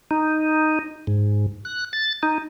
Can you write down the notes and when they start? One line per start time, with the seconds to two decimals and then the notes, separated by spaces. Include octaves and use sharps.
0.11 D#4
1.07 G#2
1.65 F#6
1.93 A6
2.23 D#4